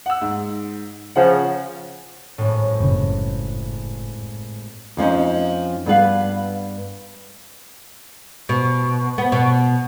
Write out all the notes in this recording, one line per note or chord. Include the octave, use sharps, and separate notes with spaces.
F#5 E6
G#2
C#3 F3 F#5
G#1 A2
F#1 C#3
F2 F3 C#4 D#4
G2 B3 B4 F5
B2
B3
B2